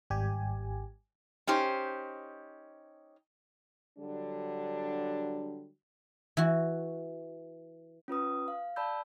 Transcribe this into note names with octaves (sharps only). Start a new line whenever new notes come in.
G#1 G3 G4 G#5
C#4 D#4 G4 C5
D3 F#3 G3 D4
E3 F#4
C#4 F4 B4 D#6
F5
D5 A5 B5 E6 G6